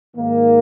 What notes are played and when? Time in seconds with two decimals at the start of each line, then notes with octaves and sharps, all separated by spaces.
0.16 G#2 D#3 A#3